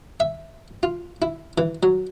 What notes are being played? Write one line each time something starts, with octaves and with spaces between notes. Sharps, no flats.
E5
F4
E4
E3
F#3